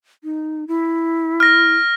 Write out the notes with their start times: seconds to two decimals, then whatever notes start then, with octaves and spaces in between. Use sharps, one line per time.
0.24 D#4
0.68 E4
1.40 F6 A#6